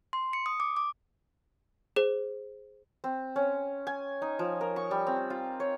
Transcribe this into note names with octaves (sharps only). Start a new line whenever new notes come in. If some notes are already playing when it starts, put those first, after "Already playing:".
C6
C#7
D#6
D6
D6
G#4 C5
C4
C#4
G#5
D#4
F3
A#4
C#6
G3
C4
F4
C#5